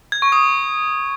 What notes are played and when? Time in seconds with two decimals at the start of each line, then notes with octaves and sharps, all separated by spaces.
0.12 G#6
0.22 C#6
0.32 D#6